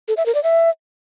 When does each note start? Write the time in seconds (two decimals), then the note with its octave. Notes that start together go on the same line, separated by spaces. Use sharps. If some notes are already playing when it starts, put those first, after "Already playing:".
0.08 A4
0.17 E5
0.26 A#4
0.35 D5
0.43 E5